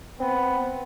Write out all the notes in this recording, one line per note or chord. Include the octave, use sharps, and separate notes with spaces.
B3 C4